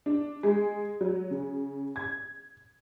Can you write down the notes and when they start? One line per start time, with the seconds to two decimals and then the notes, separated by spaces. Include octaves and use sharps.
0.06 D4
0.43 G#3
1.01 F#3
1.31 C#3
1.96 G#6